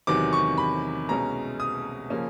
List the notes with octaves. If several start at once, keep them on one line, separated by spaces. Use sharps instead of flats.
E2 C3 D#3 F#3 D6
C#6
B5
C2 B2 G#3 C#4 A#5
D#6
C#3 F3 A#3 C#4